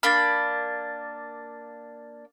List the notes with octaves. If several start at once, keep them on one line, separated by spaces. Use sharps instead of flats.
A#3 D4 B5 F6 A6